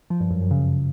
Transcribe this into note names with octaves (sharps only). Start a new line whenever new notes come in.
F3
G2
F#2
F#2
C#3